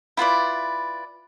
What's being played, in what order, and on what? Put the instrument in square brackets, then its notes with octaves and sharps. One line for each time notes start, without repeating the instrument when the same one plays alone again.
[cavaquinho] E4 F4 B4 D5